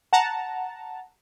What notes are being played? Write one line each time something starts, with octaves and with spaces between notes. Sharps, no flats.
F#5 A5 A#5